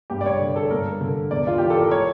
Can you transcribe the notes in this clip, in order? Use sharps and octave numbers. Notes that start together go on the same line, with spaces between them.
G2 G4
D5
C#5
D3
A4
G2 A#4
D3
E2 D5
F4
E3 G4
A4
A#4
C#5